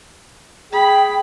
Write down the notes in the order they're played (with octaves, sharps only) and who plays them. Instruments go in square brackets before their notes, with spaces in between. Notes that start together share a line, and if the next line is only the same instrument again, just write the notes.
[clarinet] G#4 [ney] G5 [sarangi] B5